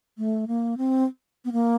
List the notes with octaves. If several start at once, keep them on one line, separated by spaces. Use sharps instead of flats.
A3
A#3
C4
B3
A#3